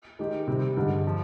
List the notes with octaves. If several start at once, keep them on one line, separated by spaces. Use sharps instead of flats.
D#3 G#3 D#4 G4
C3 G3 C4
G2 D3 G#3
F3